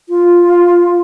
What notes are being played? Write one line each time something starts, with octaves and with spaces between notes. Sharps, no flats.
F4